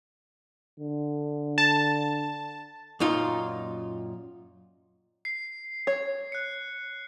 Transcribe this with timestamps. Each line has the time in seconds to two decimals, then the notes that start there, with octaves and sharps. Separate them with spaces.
0.80 D3
1.58 A5
3.00 F#2 A#2 D#4 F4
5.25 C7
5.87 C#5
6.32 F#6 C#7